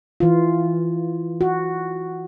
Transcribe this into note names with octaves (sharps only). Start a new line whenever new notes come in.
E3 F4
F#4